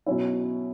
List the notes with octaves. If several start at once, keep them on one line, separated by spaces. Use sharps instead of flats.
B2 F#3 C#4 E4